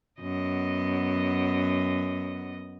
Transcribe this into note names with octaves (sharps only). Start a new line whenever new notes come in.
F#2 B3 D#5